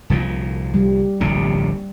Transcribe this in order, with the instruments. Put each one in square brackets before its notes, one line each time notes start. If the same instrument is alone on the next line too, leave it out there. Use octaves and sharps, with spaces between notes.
[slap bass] C2 A#2 F3
[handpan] G3
[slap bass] D1 A#1 C3